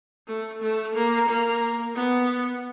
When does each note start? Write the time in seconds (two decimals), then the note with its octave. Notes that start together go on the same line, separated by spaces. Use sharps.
0.28 A3
0.62 A3
0.95 A#3
1.28 A#3
1.95 B3